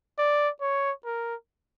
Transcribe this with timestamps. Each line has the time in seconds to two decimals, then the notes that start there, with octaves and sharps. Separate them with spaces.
0.18 D5
0.61 C#5
1.05 A#4